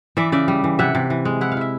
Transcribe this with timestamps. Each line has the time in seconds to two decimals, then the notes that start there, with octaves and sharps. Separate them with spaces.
0.17 E3 D5 E5
0.32 C#3 D5 E5
0.48 G3
0.64 E3
0.79 C3 E5 F#5
0.95 C3
1.10 E3
1.25 G#3
1.41 E4 F#5
1.52 F5
1.57 E4 E5